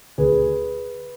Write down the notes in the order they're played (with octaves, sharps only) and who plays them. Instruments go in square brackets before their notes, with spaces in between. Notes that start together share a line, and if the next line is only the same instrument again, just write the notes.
[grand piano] D2 G#4 B4